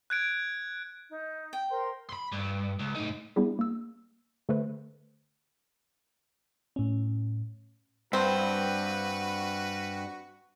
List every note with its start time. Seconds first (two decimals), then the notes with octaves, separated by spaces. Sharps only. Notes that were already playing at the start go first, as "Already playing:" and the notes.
0.10 F#6 G#6 D7
1.11 D#4
1.53 G5
1.70 A#4 C5 C6
2.09 B5 C6
2.32 G2
2.79 C#2
2.95 A2 D#4
3.36 G3 B3 D4 E4 G4 G#4
3.59 A#3 E6
4.49 D3 A3 A4 B4 C5
6.76 A2 C#4
8.13 G2 C4 F#4 B4